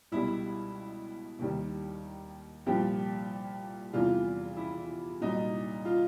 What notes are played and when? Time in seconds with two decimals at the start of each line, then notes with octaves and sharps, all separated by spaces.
0.12 C#2 B2 G3 E4
1.39 D#2 D#3 G3
2.66 C2 A#2 F3 G4
3.93 E2 C3 E3 G3 F4
4.57 E4
5.21 C2 A#2 F#3 D#4
5.85 F4